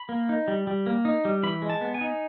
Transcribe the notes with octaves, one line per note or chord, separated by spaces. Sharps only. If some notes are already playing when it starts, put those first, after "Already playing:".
Already playing: B5
A#3
D#4
G3
G3
A#3
D#4
G3
E3 B5
G#3
A5
B3
G#5
D#4